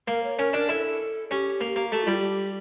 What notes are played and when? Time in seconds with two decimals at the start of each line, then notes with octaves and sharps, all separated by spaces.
0.08 A#3 A#4
0.23 C#5
0.38 C#4 A#4
0.53 D4 A#4
0.69 E4 A4
1.30 C#4 G4
1.61 A#3
1.76 A#3
1.92 A3 G4
2.05 G3 F4
2.18 G4